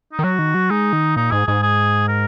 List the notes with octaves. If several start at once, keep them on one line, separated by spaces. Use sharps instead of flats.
D#4
D#3
F#3 F#4
D#3
F#3
G#3 D#4
D#3
A#2 D#4
G#2 G#4
G#2 G#4
G#4
A#4